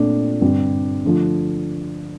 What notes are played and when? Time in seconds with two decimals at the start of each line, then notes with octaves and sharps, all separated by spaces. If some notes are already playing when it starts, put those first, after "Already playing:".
Already playing: A#2 A3 C4 D4
0.41 G2 D3 G3 C4
1.05 D3 F3 A3